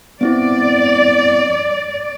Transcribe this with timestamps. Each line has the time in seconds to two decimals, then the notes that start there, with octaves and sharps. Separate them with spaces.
0.21 B3 C4 E4 D5